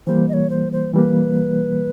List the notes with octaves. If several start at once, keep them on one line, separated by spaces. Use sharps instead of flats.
E3 G3 A#3 C5
D#5
C#5
C5
C5
E3 G3 A#3 B4